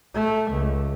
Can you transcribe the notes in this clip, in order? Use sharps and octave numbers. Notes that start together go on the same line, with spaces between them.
A3
C#2